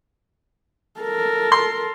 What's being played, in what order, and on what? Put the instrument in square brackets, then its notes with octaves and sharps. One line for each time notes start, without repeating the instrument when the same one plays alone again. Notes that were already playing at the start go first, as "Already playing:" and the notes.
[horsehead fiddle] A4 A#4
[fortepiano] C6